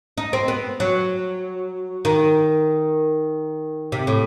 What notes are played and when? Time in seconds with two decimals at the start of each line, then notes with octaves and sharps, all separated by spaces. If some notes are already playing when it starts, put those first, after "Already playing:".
0.17 D#4
0.33 C4
0.48 B3
0.80 F#3
2.05 D#3
3.92 C3
4.07 A2